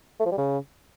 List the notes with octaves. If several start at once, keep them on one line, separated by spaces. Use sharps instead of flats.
A3
F3
G3
C#3